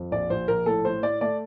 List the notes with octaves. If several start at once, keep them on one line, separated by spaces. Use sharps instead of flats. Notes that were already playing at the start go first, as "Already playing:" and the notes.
Already playing: F2
A#1 D5
A#1 C5
A#1 A#4
A2 A4
A2 C5
A2 D5
A3 D5